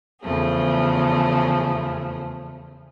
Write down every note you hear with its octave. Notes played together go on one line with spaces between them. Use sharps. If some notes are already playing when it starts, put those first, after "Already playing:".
E2 C#3 F3 A3 G#4